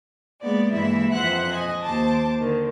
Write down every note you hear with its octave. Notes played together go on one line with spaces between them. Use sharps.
G#3 A#3 B3 D5
G2 E3 G#3 A#3 E4 E5
F2 C5 E5 F#5 F#6
D#5 G#5
D#2 C5 A5 D6
D3 D#3